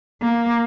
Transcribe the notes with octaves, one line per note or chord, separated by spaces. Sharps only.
A#3